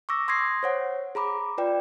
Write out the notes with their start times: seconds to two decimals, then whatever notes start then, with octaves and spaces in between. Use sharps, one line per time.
0.09 C#6 D6 E6 A#6
0.28 C6 D#6 G#6 A#6 C7
0.63 C5 C#5 F#5
1.15 G#4 A#5 B5 D6
1.58 F4 B4 D5 G5